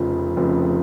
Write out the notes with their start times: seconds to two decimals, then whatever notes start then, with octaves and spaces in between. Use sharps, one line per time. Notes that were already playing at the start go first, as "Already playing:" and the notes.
Already playing: F1 F2 C#3 F3
0.36 F1 F2 C#3 F3